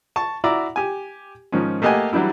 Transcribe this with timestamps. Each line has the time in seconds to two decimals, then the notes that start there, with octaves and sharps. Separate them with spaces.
0.16 A5 C#6
0.44 E4 F#4 D5 E5 A#5
0.76 G4 G#5
1.52 G#2 D#3 F3 C#4
1.82 A3 A#3 G4 D#5 F#5 G#5
2.13 E3 F#3 G3 D4 E4